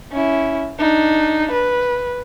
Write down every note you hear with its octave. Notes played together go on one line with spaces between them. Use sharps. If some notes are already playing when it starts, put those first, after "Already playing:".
C#4 E4
D4 D#4
B4